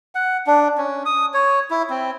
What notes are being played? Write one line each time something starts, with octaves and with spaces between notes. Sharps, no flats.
F#5
D4
C#4
D#6
C#5
E4
C4